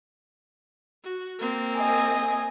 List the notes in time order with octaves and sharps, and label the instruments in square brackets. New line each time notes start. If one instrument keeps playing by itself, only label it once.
[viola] F#4
A#3 C4
[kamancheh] D#5 G#5